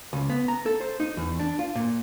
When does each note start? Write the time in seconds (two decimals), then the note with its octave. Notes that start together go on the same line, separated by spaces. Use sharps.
0.13 C#2
0.30 B3
0.48 A#5
0.66 A4
0.81 C5
1.00 D#4
1.17 E2
1.40 D4
1.59 F4
1.75 A#2